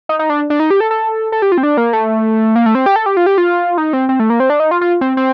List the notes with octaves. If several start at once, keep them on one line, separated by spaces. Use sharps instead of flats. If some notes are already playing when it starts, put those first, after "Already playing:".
D#4
D#4
D4
D4
D#4
G4
A4
A4
A4
G4
F4
C4
D4
A#3
A3
A#3
A3
C4
G4
A4
G4
F4
G4
F4
D#4
C4
C4
A3
A#3
C4
D4
D#4
F4
F4
C4
C4